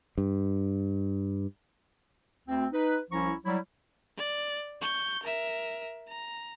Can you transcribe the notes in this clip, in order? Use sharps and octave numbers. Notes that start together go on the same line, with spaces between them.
G2
D2 C4
D#4 B4
C2 F3 C#4 E4 A#5 C#6
F#3 G3 E4
D5
C#6 G6
A#4 E5
A#5